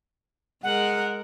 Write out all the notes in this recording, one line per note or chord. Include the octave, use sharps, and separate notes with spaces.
G#3 A#4 F#5